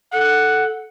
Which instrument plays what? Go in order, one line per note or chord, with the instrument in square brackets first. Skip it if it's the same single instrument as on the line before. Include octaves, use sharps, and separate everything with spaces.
[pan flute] A4 [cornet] F#5